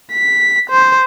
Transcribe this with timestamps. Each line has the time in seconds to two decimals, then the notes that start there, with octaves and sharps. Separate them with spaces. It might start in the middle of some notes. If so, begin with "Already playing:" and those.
0.13 B6
0.70 C5